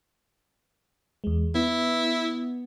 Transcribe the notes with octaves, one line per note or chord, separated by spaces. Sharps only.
E2 G#3
B3 E4